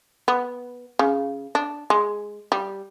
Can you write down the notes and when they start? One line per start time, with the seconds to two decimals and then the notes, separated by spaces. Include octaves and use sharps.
0.28 B3
0.99 C#3
1.55 D4
1.90 G#3
2.52 G3